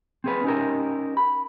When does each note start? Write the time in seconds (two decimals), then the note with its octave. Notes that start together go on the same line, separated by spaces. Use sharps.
0.24 C4 G#4 B4
0.44 C#4 D#4 G4 A#4
1.17 B5